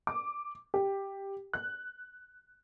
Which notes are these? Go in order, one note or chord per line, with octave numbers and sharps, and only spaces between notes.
D6
G4
F#6